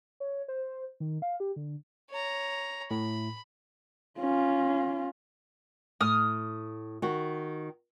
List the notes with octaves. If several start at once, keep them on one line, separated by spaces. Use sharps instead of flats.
C#5
C5
D#3
F5
G4
D3
C#5 A#5
A2 B5
C#4 F4
A2 D#6 F6
D#3 F#4